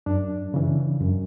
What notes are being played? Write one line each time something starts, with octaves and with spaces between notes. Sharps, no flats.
F#2 D4
C#3 E3
F#2